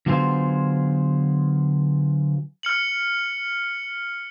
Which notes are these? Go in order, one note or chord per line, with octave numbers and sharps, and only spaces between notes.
D3 F#3 B3 F4 G#4 C5
F6 C#7 F#7